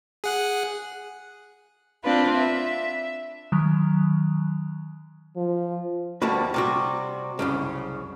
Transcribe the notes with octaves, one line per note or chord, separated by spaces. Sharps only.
G#4 F#5 F#6
C4 D4 F4 B4
E5
D#3 F#3
F3
D2 G3 A3 A#3 F#4 B4
C3 G3 F#4
C2 F#2 C#3